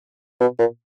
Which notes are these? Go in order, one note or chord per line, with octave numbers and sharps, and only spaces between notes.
B2
A#2